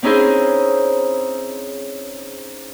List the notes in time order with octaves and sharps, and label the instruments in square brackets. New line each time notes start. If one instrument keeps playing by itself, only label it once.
[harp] C4 C#4 D#4 E4 G#4 C5